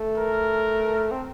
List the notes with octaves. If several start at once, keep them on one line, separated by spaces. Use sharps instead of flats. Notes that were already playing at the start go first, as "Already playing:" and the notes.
Already playing: A3
A#4
C4